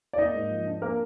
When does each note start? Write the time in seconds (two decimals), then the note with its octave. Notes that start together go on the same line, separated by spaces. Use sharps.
0.13 D5
0.18 A#3 D#4 D#5
0.34 G#2
0.50 F3
0.66 D4
0.82 A#3 A#4